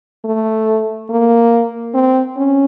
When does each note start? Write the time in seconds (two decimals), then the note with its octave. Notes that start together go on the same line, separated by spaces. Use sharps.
0.25 A3
1.10 A#3
1.94 C4
2.37 C#4